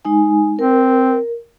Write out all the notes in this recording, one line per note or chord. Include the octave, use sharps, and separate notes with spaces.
G#3 D#4 G#5
C4 A#4